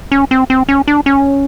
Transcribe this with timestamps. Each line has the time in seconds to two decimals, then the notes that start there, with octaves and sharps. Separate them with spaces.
0.12 C#4
0.31 C4
0.50 C4
0.69 C#4
0.88 D4
1.06 C#4